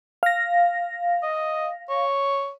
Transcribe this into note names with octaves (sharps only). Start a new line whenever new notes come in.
F5 A#6
D#5
C#5